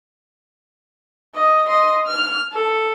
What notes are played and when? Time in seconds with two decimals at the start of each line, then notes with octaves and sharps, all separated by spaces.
1.35 D#5
1.67 D#5 C6
2.06 F6
2.52 A4